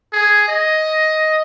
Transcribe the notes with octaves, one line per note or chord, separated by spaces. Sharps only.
G#4
D#5